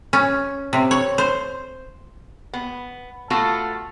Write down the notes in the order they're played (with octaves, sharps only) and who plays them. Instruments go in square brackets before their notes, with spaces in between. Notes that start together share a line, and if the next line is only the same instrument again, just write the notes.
[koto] C#4
C3
C#5
C5
[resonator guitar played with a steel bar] B3
A3 B3 F4 F#4 A4